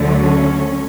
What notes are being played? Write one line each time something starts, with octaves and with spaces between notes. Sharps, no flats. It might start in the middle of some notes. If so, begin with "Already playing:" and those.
Already playing: D2 D3 F#3 A3
C#4